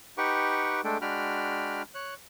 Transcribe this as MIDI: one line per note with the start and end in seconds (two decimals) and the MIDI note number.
0.18 0.81 63
0.18 0.81 67
0.18 0.81 71
0.18 0.81 78
0.18 0.81 79
0.18 0.81 85
0.84 0.98 56
0.84 0.98 57
0.84 0.98 62
0.84 0.98 69
0.84 0.98 79
1.01 1.82 56
1.01 1.82 62
1.01 1.82 66
1.01 1.82 79
1.01 1.82 83
1.01 1.82 89
1.95 2.14 73
1.95 2.14 90